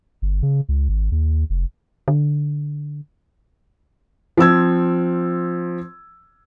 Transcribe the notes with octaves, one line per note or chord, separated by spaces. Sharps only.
G1
C#3
C#2
G#1
D#2
F1
D3
F3 C4 E6 G#6